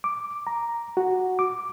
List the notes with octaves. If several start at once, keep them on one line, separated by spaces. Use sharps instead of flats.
D6
A#5
F#4
D6